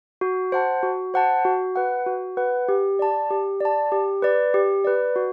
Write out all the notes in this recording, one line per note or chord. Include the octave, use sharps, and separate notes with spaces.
F#4
C5 F#5 A5
F#4
C5 F#5 A5
F#4
B4 F#5
F#4
B4 F#5
G4
D5 A5
G4
D5 A5
G4
B4 D5
G4
B4 D5
F#4